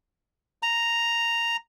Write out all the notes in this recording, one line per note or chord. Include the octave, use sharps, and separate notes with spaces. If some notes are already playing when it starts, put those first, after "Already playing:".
A#5